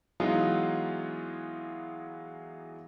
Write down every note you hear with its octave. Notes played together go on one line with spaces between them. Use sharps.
E3 F#3 G#3 B3 D#4 F4